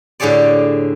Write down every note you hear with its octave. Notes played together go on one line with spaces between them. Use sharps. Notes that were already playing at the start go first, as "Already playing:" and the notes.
A2 D3 G4 G#4 C#5 D5